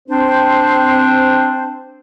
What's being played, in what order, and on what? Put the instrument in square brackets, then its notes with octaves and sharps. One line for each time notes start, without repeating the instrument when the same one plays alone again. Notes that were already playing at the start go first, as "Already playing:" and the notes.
[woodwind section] C4 D4 C5